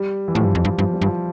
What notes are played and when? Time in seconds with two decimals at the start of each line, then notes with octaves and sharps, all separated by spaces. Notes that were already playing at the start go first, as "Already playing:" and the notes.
Already playing: G3
0.28 E3
0.34 A2 F3
0.45 G2
0.55 F2
0.65 G2
0.78 G2 F3
0.93 G3
1.01 G2
1.06 F3